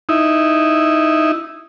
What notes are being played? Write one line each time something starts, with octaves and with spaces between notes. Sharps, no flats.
D#4 E4